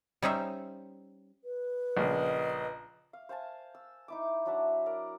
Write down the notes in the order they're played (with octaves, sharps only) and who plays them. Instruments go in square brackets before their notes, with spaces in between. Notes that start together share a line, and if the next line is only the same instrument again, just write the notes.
[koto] G3 C#4 D#4 C5 E5
[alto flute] B4
[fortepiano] A#1 C#3 [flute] D#5
[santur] F5
C5 F5 G#5 A5
E6
D#4 E4 D6
F#3 D4 E5 F#5
A#4 D5 A#5